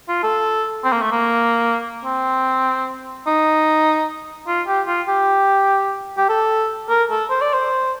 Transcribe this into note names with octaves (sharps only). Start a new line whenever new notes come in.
F4
A4
C4
A#3
A3
A#3
C4
D#4
F4
G4
F4
G4
G4
A4
A#4
A4
C5
D5
C5